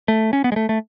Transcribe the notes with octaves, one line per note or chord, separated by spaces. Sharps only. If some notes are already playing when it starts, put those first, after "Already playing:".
A3
C#4
B3
G#3
A3
A3